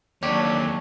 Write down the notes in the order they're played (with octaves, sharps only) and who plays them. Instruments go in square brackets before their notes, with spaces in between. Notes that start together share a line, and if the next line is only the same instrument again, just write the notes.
[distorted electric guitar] D#2 F#3 [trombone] D4 [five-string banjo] G4 [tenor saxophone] C#5